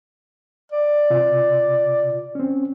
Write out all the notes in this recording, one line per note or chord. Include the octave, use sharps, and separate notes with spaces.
D5
C3 F4
C4 C#4